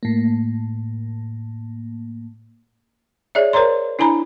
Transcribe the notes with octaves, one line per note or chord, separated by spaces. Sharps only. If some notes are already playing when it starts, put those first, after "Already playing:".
A2 A#3
G#4 C#5 D5 E5
A#4 C5 C#5 A#5 C6
D4 E4 G#5 A#5 B5